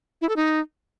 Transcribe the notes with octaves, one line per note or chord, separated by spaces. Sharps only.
E4
A4
D#4